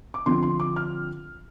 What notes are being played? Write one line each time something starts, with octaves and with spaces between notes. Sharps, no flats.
D6
D3 F3 C4 C6
C6
D6
F6